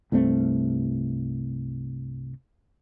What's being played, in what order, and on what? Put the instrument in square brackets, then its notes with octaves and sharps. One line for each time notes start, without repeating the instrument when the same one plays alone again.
[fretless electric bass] C2 G2 A3 C4